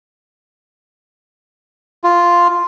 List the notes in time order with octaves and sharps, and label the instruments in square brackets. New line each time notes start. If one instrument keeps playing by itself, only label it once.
[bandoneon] F4